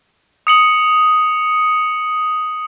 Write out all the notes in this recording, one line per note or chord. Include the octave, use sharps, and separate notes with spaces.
D#6 C#7 F#7